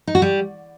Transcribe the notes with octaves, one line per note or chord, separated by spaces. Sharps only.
D#4
F#4
G3